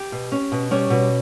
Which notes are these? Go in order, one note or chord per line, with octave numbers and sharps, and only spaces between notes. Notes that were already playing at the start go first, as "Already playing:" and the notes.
Already playing: G4
B2
C#4
B2
G3 C#4 C#5
B2